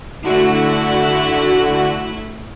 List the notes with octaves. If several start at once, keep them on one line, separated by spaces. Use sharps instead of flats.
D3 A3 E4 F#4